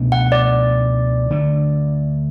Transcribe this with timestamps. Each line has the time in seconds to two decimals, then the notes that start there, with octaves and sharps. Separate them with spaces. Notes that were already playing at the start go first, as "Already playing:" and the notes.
Already playing: C#2 B2 A3 D4
0.12 F#5
0.32 D5
1.30 D2 D3 A3 D4